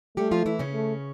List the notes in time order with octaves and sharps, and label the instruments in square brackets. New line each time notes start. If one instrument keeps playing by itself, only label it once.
[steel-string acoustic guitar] G3 G4 [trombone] A3
[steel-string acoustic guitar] F3 F4
E3 E4
C#3 C#4
[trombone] A3